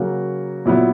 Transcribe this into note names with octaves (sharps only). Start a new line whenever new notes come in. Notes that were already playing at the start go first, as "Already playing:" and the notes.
Already playing: C#3 F#3 A#3 F#4
A#2 F#3 B3 E4